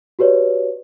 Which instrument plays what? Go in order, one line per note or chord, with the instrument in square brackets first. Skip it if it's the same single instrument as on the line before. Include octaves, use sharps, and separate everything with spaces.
[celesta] F#4 G4 B4 C#5 D5